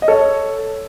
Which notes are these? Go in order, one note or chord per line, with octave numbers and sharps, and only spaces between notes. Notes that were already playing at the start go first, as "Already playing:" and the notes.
D#5
A4 C#5